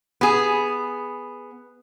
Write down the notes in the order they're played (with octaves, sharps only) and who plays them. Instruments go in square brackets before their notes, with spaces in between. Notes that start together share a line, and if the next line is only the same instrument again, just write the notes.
[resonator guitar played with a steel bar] B3 G#4